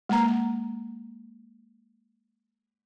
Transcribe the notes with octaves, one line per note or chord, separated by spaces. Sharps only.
G#3 A#3 A#5